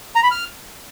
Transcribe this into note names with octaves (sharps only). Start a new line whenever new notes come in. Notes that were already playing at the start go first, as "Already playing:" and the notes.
A#5
B5
F6